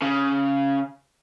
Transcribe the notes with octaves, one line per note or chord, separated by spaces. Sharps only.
C#3